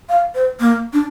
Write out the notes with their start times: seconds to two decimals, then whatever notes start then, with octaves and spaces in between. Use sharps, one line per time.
0.09 F5
0.35 C5
0.60 A#3
0.93 D4